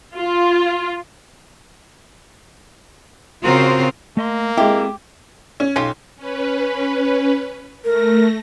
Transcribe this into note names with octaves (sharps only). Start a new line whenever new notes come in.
F4
C#3 C4 F4 F#4 A#4 C5
A3 A#3 D#5 C6
G#3 C4 E4 F#4 G4 A4
C#4
B1 C#4 F4 G4
C#4 B4
A3 A#4 A#6